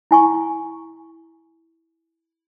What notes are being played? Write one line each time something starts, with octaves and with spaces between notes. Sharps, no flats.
E4 G#5 C#6